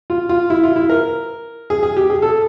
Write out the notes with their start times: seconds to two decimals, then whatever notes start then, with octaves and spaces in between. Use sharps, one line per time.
0.10 F4
0.29 F4
0.50 E4
0.64 F4
0.76 E4
0.89 A#4
1.70 G#4
1.83 G#4
1.97 G4
2.10 G#4
2.22 A4